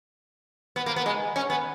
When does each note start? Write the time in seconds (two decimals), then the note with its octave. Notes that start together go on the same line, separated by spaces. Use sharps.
0.76 B3
0.86 A#3
0.96 B3
1.06 G#3
1.36 C#4
1.50 B3